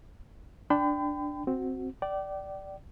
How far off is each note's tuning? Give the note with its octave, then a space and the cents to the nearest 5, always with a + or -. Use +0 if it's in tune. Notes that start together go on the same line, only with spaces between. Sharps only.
D4 +0 G5 +0 B5 +45
C4 +0 F#4 +0
D5 +0 G5 -35